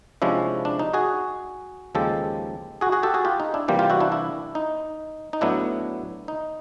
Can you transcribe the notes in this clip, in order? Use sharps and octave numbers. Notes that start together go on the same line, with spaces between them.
C3 F3 G#3 C#4 D4 E4
D4
D#4
F#4 G#4
D#2 C#3 F3 G#3 G4 A4
F#4 G#4
F#4 G#4
G4 A4
F#4 G#4
F4 G4
D#4
D4 E4
C3 E3 G3 A#3 F4 G4
F4 G4
E4 F#4
D4 E4
D4 E4
D#4
D#4
A2 F#3 B3 D4 E4
D#4